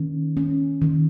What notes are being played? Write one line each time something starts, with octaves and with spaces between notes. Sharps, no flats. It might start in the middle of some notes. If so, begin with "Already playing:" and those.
Already playing: D#3 C#4
C#4
D#3